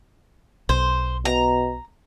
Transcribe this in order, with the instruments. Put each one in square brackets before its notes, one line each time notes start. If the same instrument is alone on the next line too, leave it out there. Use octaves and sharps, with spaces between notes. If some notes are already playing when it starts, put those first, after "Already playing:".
[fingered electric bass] B1 [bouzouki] C5
[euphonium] B2 [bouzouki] A#5